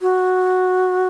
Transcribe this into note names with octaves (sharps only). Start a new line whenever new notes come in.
F#4